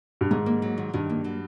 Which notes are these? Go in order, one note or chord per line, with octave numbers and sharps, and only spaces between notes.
G2
G#2 D#3
A#3
F#3
D#3
G2 D#3
A#3
F#3